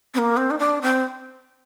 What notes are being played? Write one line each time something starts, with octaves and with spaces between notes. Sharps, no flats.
C4
A#3
C4
D#4
D4
C4